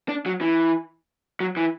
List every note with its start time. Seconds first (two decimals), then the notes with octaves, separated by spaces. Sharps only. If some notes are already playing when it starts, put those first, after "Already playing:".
0.09 D4
0.26 F#3
0.41 E3
1.40 F#3
1.57 E3